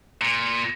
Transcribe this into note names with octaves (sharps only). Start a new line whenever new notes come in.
A#2